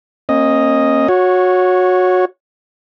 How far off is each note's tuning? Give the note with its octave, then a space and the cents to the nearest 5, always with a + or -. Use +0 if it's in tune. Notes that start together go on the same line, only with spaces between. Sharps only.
A#3 +0 C#4 -35 D#5 +0
F#4 -20 C#5 +0